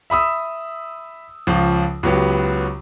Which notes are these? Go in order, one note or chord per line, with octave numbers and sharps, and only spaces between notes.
E5 B5 D#6 E6
C#2 F3
C#2 F#3 B3 G4